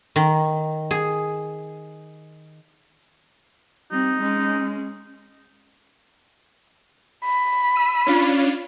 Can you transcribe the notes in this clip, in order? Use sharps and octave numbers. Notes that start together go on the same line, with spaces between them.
D#3
G#4
G3 C4 D#4
G#3 C#4
B5
E6 B6 D#7
C#4 D4 F4